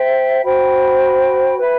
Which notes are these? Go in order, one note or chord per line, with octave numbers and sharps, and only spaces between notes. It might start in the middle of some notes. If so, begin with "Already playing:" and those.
Already playing: C5 E5 G5
F#4 C5 G5 B5
B4 E5 B5